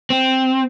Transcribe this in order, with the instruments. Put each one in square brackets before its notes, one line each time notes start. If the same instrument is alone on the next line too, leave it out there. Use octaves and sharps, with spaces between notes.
[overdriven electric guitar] C4